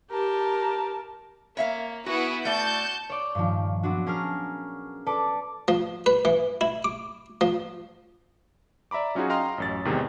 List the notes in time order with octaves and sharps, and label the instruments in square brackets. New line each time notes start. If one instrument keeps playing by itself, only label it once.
[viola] G4 [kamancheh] A#4 A5
[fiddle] A#3 [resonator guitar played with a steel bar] C#5 E5 F5
[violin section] B3 E4 [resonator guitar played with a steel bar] F#4 [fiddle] G#4 F#5
[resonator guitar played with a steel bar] A3 D5 [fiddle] F#4 A5 [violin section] G6
[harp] C#5 D5
G2 A#2 D#3 F3
F#3 B3 C4 D4 F#4
C#4 G#4 A#4 A5 F6
A4 B4 D5 A5 D6
[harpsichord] F3
B4
E3
E4
D6
F3
[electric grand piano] D5 E5 A#5 B5 D6
F#3 C#4 D#4 F4 F#4 G#4
D#5 F5 G5 A#5 C6 F6
A1 F#2 A6
E2 G#2 C3 D#3